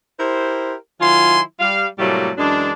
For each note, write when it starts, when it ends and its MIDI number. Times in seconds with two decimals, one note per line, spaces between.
0.19 0.74 64
0.19 0.74 67
0.19 0.74 70
0.19 0.74 72
1.00 1.41 51
1.00 1.41 54
1.00 1.41 64
1.00 1.41 65
1.00 1.41 80
1.00 1.41 84
1.60 1.86 55
1.60 1.86 77
1.99 2.31 45
1.99 2.31 48
1.99 2.31 54
1.99 2.31 55
1.99 2.31 57
1.99 2.31 58
2.38 2.72 42
2.38 2.72 52
2.38 2.72 56
2.38 2.72 62